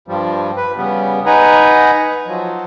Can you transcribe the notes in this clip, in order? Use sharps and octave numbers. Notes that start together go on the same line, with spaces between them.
G2 F3 G3
B4
C#3 G3 B3
D#4 B4 F#5 G#5 A#5
F3 F#3